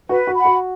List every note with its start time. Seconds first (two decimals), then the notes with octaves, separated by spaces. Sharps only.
0.09 F#4 B4
0.27 F#4
0.36 F#5 B5
0.45 F#4